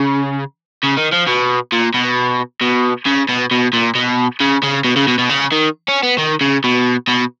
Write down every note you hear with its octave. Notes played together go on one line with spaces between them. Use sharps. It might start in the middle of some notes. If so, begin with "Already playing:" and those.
Already playing: C#3
C#3
D#3
F3
B2
A#2
B2
B2
C#3
B2
B2
A#2
B2
C#3
C#3
B2
C#3
B2
B2
C#3
D#3
C#4
B3
D#3
C#3
B2
B2